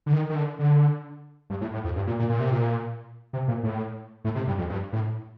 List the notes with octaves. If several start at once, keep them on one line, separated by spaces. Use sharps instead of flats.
D3
D#3
D#3
D3
D3
G2
A2
A2
F2
G2
A#2
A#2
A#2
C3
A#2
C3
A#2
A2
A2
C3
G2
F2
G2
A2